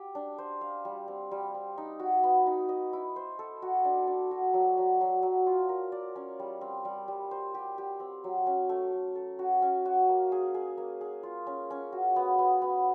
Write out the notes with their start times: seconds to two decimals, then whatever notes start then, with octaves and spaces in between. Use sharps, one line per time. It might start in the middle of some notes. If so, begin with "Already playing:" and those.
Already playing: G4
0.15 D4
0.38 C5
0.61 F5
0.85 G3
1.08 C4
1.31 G3
1.55 C4
1.78 D#4
1.99 F#4
2.24 B3
2.47 D#4
2.69 D#5
2.93 E4
3.16 C5
3.39 A4
3.62 F#4
3.85 D4
4.07 D4
4.31 F#4
4.54 F#3
4.78 F#3
5.01 F#3
5.23 F#3
5.47 F4
5.69 A#4
5.92 D5
6.16 C#4
6.39 G3
6.61 C4
6.85 G3
7.08 G3
7.31 C5
7.54 G4
7.78 G4
8.00 C4
8.24 F#3
8.47 C#4
8.69 A3
8.93 A3
9.15 A4
9.39 F#4
9.62 C#4
9.85 F#4
10.09 A#3
10.32 G#4
10.54 G#4
10.78 A#3
11.01 G#4
11.23 F4
11.47 C#4
11.70 C#4
11.93 F#4
12.16 B3
12.39 B3
12.62 B3